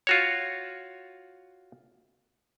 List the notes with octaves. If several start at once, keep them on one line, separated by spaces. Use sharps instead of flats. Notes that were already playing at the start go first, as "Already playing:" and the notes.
F4 F#4 C#5